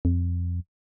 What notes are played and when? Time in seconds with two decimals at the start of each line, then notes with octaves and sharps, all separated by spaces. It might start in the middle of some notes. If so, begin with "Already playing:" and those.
0.05 F2